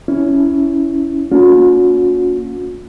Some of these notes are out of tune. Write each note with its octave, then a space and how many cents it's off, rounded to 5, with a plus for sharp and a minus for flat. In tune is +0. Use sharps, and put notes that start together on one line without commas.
C#4 +15 E4 +0
A#3 +0 C#4 +35 F#4 -40